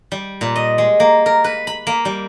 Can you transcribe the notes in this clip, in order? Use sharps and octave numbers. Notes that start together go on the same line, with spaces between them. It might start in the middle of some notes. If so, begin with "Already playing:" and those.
G3
A#2
D#5
G#3
A#3
A#4
B4
B5
A#3
G3